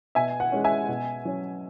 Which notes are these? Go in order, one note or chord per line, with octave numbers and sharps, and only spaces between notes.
B2 E5 G#5
F#5
G#3 C#4
E5 G#5
B2
F#3 C#4